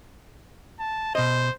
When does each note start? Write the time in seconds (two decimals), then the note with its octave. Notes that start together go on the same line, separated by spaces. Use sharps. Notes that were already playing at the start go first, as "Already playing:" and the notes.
0.80 A5
1.15 B2 C5 D#5